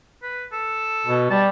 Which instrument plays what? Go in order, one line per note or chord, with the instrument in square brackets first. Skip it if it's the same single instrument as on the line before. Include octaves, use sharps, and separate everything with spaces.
[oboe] B4
A4
[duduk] B2
[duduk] G3 [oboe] A5